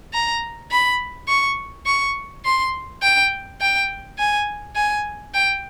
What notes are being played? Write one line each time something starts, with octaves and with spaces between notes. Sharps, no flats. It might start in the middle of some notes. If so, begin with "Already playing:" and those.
A#5
B5
C#6
C#6
C6
G5
G5
G#5
G#5
G5